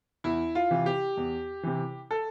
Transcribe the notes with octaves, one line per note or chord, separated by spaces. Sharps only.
E2 E4
F4
C3 E3
G4
E2
C3 E3
A4